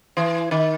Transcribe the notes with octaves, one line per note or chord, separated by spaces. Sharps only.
E3
D#3